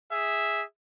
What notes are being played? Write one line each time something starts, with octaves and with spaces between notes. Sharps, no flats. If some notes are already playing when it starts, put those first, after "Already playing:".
G#4 E5